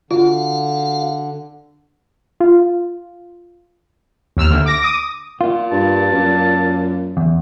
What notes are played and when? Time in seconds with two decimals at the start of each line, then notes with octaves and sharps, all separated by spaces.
0.11 D3 F4 F#4 F5
2.40 F4
4.37 D#2 E6 F6
4.50 D2
4.66 D6 A#6
4.82 D6 D#6
5.41 A#2 F4
5.72 G2 A5
6.12 F#2
7.17 E2